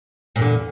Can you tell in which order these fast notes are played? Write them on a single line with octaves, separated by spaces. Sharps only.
A#2 E2 D3